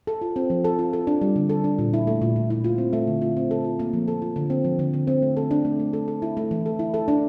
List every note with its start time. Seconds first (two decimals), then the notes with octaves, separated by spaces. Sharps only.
0.07 A4
0.22 F4
0.36 C4
0.50 F3
0.64 A4
0.79 F4
0.93 A4
1.07 D4
1.21 G3
1.36 D3
1.50 A4
1.64 D4
1.79 A#2
1.93 E4
2.07 A3
2.21 A#2
2.36 A#2
2.50 E4
2.64 F4
2.78 C4
2.93 A3
3.07 D3
3.22 F4
3.37 C4
3.51 A4
3.65 F4
3.79 A#3
3.93 F3
4.08 A4
4.22 F4
4.36 D3
4.50 C4
4.64 F3
4.79 D3
4.93 D3
5.07 C4
5.22 A3
5.37 A4
5.51 D4
5.65 A3
5.79 A3
5.93 A4
6.08 A4
6.22 E4
6.37 A3
6.51 E3
6.66 A4
6.79 E4
6.94 A4
7.08 D4